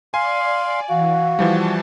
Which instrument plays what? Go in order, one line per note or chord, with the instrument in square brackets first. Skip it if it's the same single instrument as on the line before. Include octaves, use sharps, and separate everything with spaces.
[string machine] D5 [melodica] F5 C6 [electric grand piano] G#5
[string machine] E3 [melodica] F#4 [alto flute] F5
[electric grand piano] E3 F3 G3 [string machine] A5